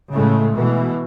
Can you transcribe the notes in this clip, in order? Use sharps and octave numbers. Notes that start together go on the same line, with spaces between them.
A2 C#3 G#3 A3
B2 E3